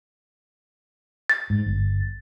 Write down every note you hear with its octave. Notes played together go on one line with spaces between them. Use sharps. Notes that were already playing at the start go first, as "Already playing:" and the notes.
A6
G#2
G1